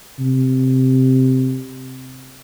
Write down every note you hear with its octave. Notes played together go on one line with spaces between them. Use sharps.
C3